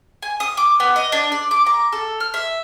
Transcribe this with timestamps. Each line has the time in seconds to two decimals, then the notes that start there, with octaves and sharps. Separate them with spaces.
0.23 G#5
0.40 D#6
0.57 D6
0.80 B3
0.96 D#5
1.12 D4
1.32 D5
1.51 D6
1.66 A#5
1.92 A4
2.20 F6
2.34 E5